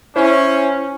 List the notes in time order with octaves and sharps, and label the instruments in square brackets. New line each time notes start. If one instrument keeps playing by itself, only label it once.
[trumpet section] C#4 [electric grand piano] E4 C5